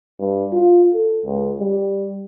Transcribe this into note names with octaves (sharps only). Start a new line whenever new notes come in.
G2
F4
A4
C#2
G3